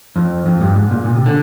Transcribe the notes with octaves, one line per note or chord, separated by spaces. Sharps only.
F2
F2
G2
G#2
A#2
A#2
C3
D3